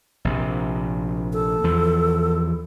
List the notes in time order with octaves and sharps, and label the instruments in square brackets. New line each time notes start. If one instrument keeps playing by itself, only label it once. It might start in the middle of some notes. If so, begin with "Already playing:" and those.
[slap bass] A#1 C3
[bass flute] A4
[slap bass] E2 F3